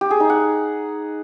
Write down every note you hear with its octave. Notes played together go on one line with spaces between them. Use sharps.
G4
G#4
D#4
F#5